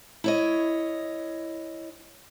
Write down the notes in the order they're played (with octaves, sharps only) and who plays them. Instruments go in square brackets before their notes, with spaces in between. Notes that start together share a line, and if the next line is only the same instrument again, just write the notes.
[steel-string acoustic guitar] E4 C#5 D#5